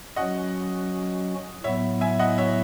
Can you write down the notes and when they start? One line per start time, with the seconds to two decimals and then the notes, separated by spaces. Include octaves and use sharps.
0.16 F#3 C#4 F#4 D#5 F#5
1.64 A2 F#3 B3 E4 C#5 E5
2.01 E5 G#5
2.19 D#5 F#5
2.38 C#5 E5